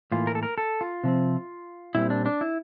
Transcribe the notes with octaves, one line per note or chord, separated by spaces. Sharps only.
A2 E3 A#3 F4
A#4
A4
A#4
A4
F4
C3 F3 C4
A#2 G3 C4 E4
D4
D4
E4